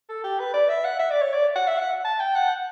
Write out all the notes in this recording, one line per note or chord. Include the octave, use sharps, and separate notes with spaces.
A4
G4
B4
D5
E5
F#5
E5
D5
C#5
D5
F#5
E5
F#5
A5
G5
F#5